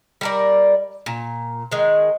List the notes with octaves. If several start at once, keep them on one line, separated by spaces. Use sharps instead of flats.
G3 A#4 D5
A#2
D#3 G#3